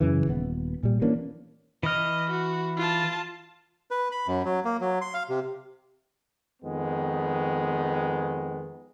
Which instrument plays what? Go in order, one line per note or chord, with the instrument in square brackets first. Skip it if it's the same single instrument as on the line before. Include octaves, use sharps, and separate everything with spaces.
[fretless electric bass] F#2 C#3 E3
D#1 B3
A#2 G3
E3 A#3 C#4 D4
[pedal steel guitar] E3 F6 [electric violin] D#5
[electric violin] F#4
F4 A5
[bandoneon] B4
B5
F#2
F#3
A#3
F#3
C6
F5
C3
[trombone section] F2 D#3 G#3 B3